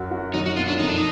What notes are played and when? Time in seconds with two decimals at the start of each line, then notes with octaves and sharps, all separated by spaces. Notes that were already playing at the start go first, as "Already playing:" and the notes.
Already playing: F#2 F#4
0.11 F#4
0.34 F#3 D#4
0.46 F#4
0.56 B2 F4
0.68 D4
0.79 F2 D#4
0.87 D4
0.96 D#4